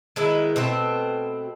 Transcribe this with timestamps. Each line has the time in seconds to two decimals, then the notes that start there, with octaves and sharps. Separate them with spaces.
0.16 D#3 G#3 B3 E4
0.56 B2 A3 C4